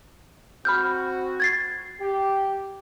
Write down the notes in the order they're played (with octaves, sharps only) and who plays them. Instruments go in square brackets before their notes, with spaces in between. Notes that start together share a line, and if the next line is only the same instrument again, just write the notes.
[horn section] C4 F#4 [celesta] B5 F6 G6
[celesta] G#6 A6 C7
[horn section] G4